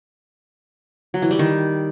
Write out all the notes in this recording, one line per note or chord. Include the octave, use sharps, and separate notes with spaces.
F#3
E3
G3
D#3